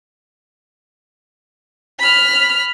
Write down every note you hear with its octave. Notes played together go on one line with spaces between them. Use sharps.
B5 F6